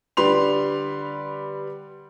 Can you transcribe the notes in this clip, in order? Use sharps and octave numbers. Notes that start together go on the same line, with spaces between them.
D3 G3 B4 C6 F7